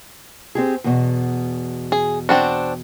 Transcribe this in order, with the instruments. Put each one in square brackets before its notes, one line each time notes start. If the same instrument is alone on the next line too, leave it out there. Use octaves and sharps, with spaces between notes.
[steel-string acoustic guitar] C4 G4 G#4
E2 B2
[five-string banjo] G#4
C4 D4 F#4